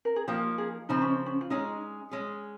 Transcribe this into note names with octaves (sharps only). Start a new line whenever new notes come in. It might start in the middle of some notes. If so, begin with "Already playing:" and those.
A#4
G#4
F3 A#3 D#4 G4
G#4
C#3 F3 C4 D#4
C#4
C#4
F4
G#3 C#4 D#4 G#4
G#3 C#4 G#4